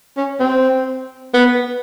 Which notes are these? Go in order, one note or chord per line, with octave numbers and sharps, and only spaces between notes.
C#4
C4
B3